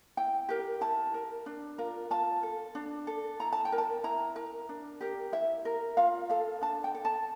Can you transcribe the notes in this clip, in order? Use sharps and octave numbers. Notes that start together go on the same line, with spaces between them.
E4 G5
G4 A#4
E4 A5
A#4
D4
F4 A#4
F4 A5
A4
D4
A4
E4 A#5
A5
G5
A#4
A5
E4 A#5
A#4
D4
G4 A#4
E4 E5
A#4
F4 F5
A4 F5
D4 A5
G5
A4
A5